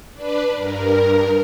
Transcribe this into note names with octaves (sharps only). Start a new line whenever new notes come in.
D4 B4 D5
G2 A#4